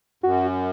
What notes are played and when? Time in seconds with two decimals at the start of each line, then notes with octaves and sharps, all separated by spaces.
0.23 F#2 F#4